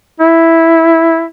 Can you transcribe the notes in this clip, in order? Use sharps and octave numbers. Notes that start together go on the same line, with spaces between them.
E4